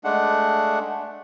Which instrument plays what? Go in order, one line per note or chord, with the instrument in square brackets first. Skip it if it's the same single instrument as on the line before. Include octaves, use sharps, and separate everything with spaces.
[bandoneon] G#3 A3 D4 F#5